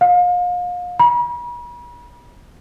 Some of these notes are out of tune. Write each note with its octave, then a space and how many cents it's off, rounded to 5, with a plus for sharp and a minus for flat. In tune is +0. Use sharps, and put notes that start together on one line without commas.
F5 +35
B5 -45